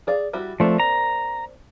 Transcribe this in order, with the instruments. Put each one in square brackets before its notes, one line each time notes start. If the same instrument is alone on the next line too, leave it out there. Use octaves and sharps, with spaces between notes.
[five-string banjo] G#4 D5 F5
G3 E4 F#4
[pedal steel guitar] F3 A3 [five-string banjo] A#3 C4 D4
[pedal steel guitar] A#5